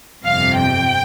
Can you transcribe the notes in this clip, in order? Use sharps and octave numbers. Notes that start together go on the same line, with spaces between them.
G1 F2 C3 F5
G5